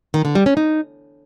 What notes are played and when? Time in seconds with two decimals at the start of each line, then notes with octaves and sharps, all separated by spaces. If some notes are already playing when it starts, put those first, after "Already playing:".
0.14 D#3
0.25 D3
0.35 G3
0.46 C#4
0.57 D#4